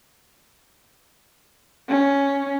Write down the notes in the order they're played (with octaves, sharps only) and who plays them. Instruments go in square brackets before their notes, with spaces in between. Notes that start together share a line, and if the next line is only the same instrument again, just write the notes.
[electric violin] C#4